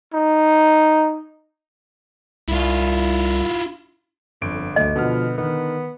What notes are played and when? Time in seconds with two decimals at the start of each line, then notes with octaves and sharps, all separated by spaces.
0.14 D#4
2.48 C2 E4 F4
4.42 G1 F2 D3 D7
4.76 D2 A3 D#5
4.96 B2 D3 F3 B3 F6
5.38 D#3 B3